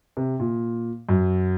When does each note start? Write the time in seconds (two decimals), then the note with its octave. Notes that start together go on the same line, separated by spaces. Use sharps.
0.17 C3
0.40 A#2
1.09 F#2